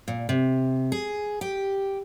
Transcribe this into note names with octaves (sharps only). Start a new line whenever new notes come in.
A#2
C3
G#4
G4